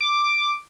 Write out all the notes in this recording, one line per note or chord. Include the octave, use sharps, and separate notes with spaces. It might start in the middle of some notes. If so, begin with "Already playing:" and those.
D6